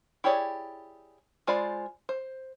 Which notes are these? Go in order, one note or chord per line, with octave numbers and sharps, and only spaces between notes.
E4 G4 G#4 C#5 D5
G#3 F4 C5 D5 B5
C5